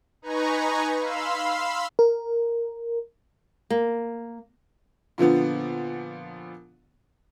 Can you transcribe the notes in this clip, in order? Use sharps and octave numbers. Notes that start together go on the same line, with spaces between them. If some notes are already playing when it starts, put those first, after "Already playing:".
D#4 B4 G#5 A#5 C#6
F5 B5 C6 E6
A#4
A#3
A#2 D3 F3 B3